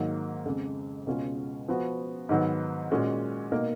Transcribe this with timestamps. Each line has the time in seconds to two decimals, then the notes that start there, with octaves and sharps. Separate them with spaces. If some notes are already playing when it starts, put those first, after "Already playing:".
Already playing: G#2 D#3 F#3 A#3
0.45 F2 C#3 G#3
1.07 C#2 B2 G#3 C#4 F4
1.68 F3 B3 F#4
2.29 G#2 D#3 F#3 B3
2.90 A#2 G#3 C#4 F#4
3.52 B2 A#3 D#4 A#4